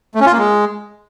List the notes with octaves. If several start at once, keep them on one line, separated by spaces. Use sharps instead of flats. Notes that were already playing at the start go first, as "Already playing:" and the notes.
A3
C#4
F4
A#3
G#3